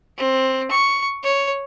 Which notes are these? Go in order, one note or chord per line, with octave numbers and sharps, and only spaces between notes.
C4
C#6
C#5